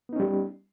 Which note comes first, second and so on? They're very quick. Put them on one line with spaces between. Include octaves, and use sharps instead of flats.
B3 D#4 C#4 G3